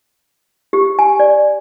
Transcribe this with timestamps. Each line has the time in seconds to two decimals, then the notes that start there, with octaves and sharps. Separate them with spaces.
0.73 G4
0.99 G#5
1.20 D5